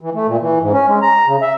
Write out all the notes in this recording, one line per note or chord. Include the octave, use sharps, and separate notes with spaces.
E3
A3
A#2
E3
G#2
C#4
G#3
A#5
C#3
E5